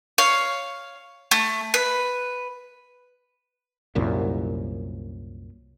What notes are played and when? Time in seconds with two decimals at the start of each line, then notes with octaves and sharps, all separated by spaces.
0.18 C#5 F5
1.31 A3
1.74 B4
3.95 C2 F#2 A#2